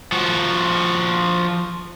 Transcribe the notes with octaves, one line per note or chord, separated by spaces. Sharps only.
F3 F#4